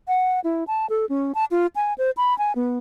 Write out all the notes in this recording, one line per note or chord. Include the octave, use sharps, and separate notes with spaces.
F#5
E4
A5
A4
C#4
A5
F4
G#5
C5
B5
G#5
B3